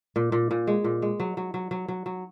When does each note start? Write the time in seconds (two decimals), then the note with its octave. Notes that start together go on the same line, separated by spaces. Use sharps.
0.16 A#2
0.32 A#2
0.51 A#2
0.67 G#3
0.84 A#2
1.02 G#3
1.20 F#3
1.37 F#3
1.54 F#3
1.71 F#3
1.88 F#3
2.06 F#3